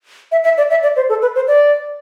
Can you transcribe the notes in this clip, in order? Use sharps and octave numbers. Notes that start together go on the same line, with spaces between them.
E5
E5
D5
E5
D5
C5
A4
B4
C5
D5